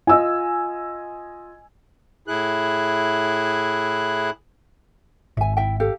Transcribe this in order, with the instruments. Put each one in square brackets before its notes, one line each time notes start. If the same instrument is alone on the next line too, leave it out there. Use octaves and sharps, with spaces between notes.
[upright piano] F4 D#5 [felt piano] G#5 E6
[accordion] A2 E4 G#4 F#6
[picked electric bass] G#1 [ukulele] E5 G#5
[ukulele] E4 E5 G5
G4 A4 F5